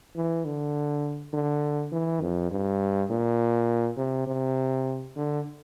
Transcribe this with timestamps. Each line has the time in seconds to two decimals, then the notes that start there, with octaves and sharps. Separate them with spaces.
0.16 E3
0.45 D3
1.33 D3
1.92 E3
2.21 F2
2.51 G2
3.10 A#2
3.97 C3
4.27 C3
5.16 D3